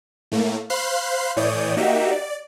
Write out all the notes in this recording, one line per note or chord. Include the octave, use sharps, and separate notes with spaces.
A2 A3 A#3
C5 F5 B5 C6 F#6 C7
A2 E3 C#5 D5 D#6 G6
A#3 D#4 F#4 G4 E5
D5